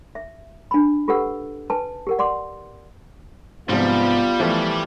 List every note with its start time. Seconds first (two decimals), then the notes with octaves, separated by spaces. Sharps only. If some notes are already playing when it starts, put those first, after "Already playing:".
0.15 E5
0.71 D4 B5
1.08 F4 G4 A4 B4 F#5 E6
1.70 B4 G#5 A5
2.07 G4 A#4 F#5
2.19 D5 F#5 C6 D6
3.69 G#2 C3 F3 G3 B3 F4
4.40 E3 F3 A3